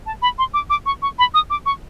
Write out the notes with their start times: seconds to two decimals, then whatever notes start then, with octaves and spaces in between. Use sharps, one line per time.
0.06 A5
0.22 B5
0.38 C6
0.54 D6
0.70 D6
0.86 C#6
1.02 C#6
1.19 B5
1.34 D#6
1.50 D6
1.66 C#6